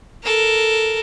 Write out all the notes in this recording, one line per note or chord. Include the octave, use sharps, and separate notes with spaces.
A4 A#4